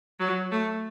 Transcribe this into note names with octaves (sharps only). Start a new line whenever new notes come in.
F#3
A3